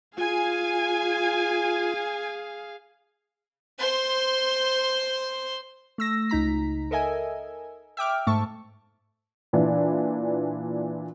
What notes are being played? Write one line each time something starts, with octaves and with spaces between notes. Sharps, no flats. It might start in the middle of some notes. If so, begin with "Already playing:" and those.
F4 G#4 F5 G#5
C5 C6
A3 E6 A#6
C#2 D#4 A#5 B6
A4 A#4 D#5 E5 G#5
E5 G5 D6 F6
G#2 A3 E5 A5 C#6
A#2 E3 D4